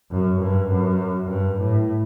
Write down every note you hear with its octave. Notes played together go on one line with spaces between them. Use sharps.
F#2
G2
F#2
G2
A2